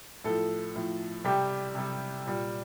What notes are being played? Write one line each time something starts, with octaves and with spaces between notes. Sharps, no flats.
A2 F3 A4
A2 F3
C3 G3 G4
C3 G3
A#2 G3